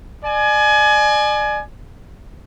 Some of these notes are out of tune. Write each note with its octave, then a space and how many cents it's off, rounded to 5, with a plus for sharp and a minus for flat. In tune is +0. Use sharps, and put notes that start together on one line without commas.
D5 +35 G#5 +25